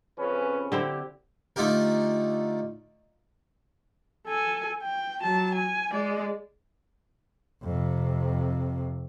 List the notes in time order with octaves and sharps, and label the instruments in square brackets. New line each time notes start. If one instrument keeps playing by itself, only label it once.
[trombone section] F2 C#3 C#4 [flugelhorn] B4
[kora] D3 C4 E4 [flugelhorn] G4
[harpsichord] D3 A3 D#4 F4 G4 A#4
[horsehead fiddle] A4 G#5
G5
F#3 A5
G#5
G#3 D5
[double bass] F2 C3